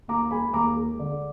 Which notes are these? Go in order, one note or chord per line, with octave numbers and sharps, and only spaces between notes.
D#2 A#5 D6
G#3 G#5 B5
D#2 A#5 D6
G#3
D3